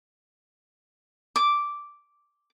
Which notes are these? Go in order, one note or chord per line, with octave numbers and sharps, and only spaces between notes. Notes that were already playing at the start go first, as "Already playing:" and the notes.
D6